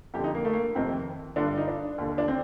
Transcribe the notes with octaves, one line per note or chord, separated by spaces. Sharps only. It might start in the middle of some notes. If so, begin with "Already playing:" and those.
F2 G4
D3
D#4
A#3
A3
A#3
F2 C3 D#3 C4
G2 D3 D4
D#4
D4
D#2 D3
D4
C4